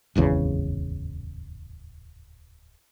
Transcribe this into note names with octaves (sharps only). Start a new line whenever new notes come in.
D1 G#1 E2 C#3